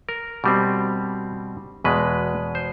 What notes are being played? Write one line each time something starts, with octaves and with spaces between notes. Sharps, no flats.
A#4
B2 G3 C4
E2 B2 G#3 B4
C5